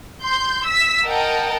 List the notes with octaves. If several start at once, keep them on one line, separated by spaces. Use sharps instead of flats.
C6 G6
E6 B6
A#4 D#5 F#5 G5 A5